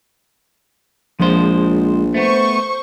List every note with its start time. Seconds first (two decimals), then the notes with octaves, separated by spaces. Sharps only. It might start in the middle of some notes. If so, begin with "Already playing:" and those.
1.20 A#1 F3 G#3 C5
2.14 A3 B3 C5 C#6